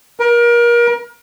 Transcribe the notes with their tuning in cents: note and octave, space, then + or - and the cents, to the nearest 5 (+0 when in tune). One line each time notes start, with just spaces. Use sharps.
A#4 +30